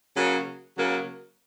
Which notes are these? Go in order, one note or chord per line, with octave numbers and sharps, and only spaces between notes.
C#3 F#3 A#3
C#3 F#3 A#3